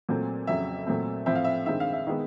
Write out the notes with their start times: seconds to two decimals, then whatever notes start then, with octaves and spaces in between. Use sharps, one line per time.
0.09 A#2 F#3 A3 C4
0.47 F2 C#3 F#3 E5
0.87 A#2 F#3 A3 C4
1.26 A2 F3 A3 C4 E5
1.35 F5
1.45 E5
1.66 G2 D#3 G#3 C4 E5
1.80 F5
1.93 E5
2.07 D#3 G#3 B3